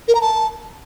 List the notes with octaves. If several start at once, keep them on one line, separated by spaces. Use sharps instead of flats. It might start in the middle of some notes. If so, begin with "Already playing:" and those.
A#4
A#5
A5